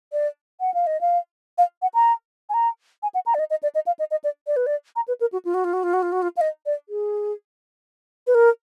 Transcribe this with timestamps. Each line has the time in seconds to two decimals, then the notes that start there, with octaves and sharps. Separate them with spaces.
0.12 D5
0.60 F#5
0.74 F5
0.87 D#5
1.01 F5
1.58 F5
1.82 F#5
1.94 A#5
2.49 G#5
2.54 A#5
3.03 G#5
3.14 F#5
3.26 A#5
3.34 D5
3.39 D#5
3.50 D#5
3.63 D5
3.75 D#5
3.87 F5
3.99 D#5
4.11 D#5
4.24 D5
4.47 D5
4.56 B4
4.66 D5
4.96 A#5
5.08 B4
5.21 A#4
5.32 F#4
5.45 F4
5.54 F#4
5.64 F4
5.73 F#4
5.83 F4
5.93 F#4
6.02 F4
6.12 F#4
6.22 F4
6.37 F5
6.41 D#5
6.66 D5
6.89 G#4
8.27 B4
8.35 A#4